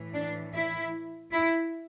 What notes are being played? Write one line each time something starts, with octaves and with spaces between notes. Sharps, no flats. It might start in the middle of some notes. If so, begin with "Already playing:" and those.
Already playing: A2 E3
D4
E4
E4